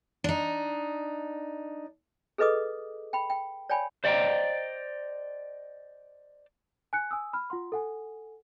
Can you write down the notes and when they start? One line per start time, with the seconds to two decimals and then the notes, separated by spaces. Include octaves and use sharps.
0.24 D4 D#4
2.38 G#4 A4 B4 D#5 D6 D#6
3.13 G5 B5
3.30 G5
3.69 C#5 D5 G5 G#5 B5
4.04 C5 D5 D#5 F#5 G5 A#5
6.93 G#5 F#6 C#7
7.11 G#5 D#6 E6
7.33 B5 F6
7.50 F4 F#5 C6
7.72 A4 F#5 G#5